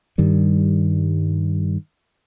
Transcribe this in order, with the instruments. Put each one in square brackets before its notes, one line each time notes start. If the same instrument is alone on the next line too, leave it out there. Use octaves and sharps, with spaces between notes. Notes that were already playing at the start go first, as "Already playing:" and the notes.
[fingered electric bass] G2 D#3 G3